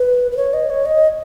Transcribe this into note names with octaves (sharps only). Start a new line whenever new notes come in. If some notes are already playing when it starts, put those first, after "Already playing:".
Already playing: B4
B4
C#5
D#5
C#5
D#5